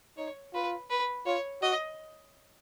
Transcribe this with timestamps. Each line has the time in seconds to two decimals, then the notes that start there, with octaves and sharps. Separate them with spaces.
0.17 D#4 C#5
0.53 F4 B4
0.90 B4
1.26 F4 C#5
1.62 F#4 D#5